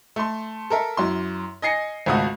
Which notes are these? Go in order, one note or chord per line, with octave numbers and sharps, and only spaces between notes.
A3 C6
A4 A#4 E5
F#2 E4 C6
D#5 G#5 A#6 C7 C#7
G#1 C#2 A3 F#4 D#6